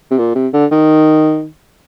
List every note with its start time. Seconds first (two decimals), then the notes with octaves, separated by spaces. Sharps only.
0.11 C3
0.18 A#2
0.35 C3
0.54 D3
0.72 D#3